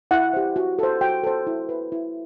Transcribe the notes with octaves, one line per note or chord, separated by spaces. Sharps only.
E4 F#5
G4 C5
F#4
A4 C5
F#4 G5
A4 C5
E4
B4
E4